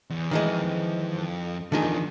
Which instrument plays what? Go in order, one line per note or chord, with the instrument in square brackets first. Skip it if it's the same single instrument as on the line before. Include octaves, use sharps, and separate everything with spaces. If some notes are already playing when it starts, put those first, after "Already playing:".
[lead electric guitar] E2
[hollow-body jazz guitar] D#3 E3 G#3
[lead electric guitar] F2
[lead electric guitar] E2 F3 [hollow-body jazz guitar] D3 D#3 G#4